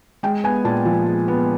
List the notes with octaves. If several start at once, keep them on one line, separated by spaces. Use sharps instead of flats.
G#3 G5
B3 G#5
A#2 A5
F3
G#3
B3